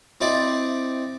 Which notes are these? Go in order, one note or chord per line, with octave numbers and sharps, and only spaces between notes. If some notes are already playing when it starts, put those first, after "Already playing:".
C4 D#4 E4 D5